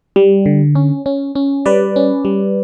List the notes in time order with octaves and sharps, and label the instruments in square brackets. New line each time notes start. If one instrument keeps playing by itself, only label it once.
[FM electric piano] G3
D3
C#4
C#4
C#4
G3 B4 D5
C#4
G3